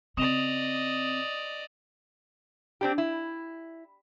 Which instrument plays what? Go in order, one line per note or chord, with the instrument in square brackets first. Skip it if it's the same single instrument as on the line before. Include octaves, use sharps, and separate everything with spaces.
[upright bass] C#3 C4 [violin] D5 D#5 [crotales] D#6 E7 F7
[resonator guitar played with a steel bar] C4 D4 G4
E4